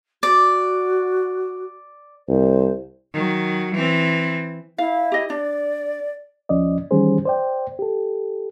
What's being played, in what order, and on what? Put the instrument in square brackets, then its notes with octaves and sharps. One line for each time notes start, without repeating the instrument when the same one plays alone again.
[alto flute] F#4 [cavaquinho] D5
[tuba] C2 [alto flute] C5
[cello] D#3 F#3
E3 C4
[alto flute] E4 [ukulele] F5
[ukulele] G4 D#5
[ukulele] D4 [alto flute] D5
[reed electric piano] D#2 F3 C#4 D5 D#5
D#3 E3 G3 C#4 G#4 C5
C5 D5 G5
G4 A4